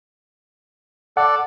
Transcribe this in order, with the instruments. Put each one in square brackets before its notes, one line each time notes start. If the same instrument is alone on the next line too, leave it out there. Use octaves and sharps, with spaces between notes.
[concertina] A4 D5 [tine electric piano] F#5